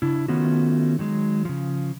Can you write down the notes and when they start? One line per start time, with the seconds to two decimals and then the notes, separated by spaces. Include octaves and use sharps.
0.02 C#3 D4 E4
0.28 D#3 A3 B3 C#4 F4 F#4
0.99 D#3 F#3 G#3
1.45 C#3 F3